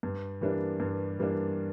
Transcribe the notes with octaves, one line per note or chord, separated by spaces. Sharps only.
G2
E3 G3 A#3 D4
G2
E3 G3 A#3 D4